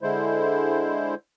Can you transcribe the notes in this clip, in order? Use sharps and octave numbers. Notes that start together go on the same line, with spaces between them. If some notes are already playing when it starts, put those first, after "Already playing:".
D3 G#3 E4 C5